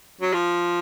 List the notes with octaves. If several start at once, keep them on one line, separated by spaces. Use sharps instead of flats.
F#3
F3